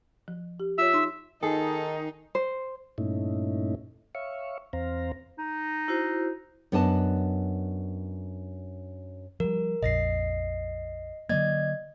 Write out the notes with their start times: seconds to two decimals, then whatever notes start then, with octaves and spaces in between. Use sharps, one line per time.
0.28 F3
0.60 G4
0.78 F4 C#5 E5 E6
0.93 D#4 C6
1.43 D#3 D#4 G#4 A4
2.35 C5
2.98 G2 A#2 A3 C#4 D#4 E4
4.15 C#5 E5 F5 C#6
4.73 E2 C4 C5 F5 A#5
5.39 D#4
5.88 E4 F#4 C5
6.72 F#2 B3 D4 D#5 A5
9.40 F3 G3 A#4
9.83 A#1 F2 D#5 A#6 C7
11.29 D3 F#3 A#3 D5 D#5 G#6